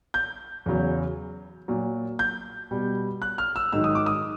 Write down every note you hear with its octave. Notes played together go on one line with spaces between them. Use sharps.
G6
E2 C#3 F#3
A#2 F#3
G6
B2 G3
F#6
F6
E6
G#2 D#3 F#3 E6
D#6
D6
D#6